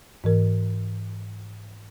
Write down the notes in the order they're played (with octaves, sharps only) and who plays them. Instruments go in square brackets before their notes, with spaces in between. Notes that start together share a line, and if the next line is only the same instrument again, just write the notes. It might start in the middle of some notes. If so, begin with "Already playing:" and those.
[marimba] G#2 E3 A#4